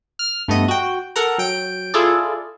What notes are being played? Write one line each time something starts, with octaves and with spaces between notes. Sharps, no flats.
F6
G2 A3 B3 D#5
F#4 G5
A4 A#4 F#5 A#5
F#3 G5 D7
E4 F4 G#4 A4 D5